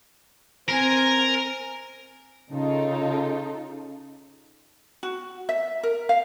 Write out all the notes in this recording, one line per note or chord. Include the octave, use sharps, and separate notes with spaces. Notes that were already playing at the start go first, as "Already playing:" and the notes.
C4 A#4 G#5
C#3 D#4 F4 A4
F#4
E5
A#4
F5